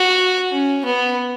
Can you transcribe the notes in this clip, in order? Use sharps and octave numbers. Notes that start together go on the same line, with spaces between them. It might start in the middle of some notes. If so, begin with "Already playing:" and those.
Already playing: F#4
C#4
B3